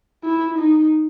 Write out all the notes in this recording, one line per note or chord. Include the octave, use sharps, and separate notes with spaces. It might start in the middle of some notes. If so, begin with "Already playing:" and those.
E4
D#4